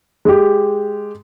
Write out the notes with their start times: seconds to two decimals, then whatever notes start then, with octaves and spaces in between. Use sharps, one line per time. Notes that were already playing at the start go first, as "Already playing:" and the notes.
0.25 G#3 G4